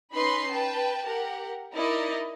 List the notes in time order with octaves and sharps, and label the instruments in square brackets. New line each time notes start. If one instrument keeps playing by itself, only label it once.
[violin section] C#4 D#4 B4 B5 C6 C7
B4 G5 A5
G4 A#4 F#5
D#4 E4 A#4 D5 D#5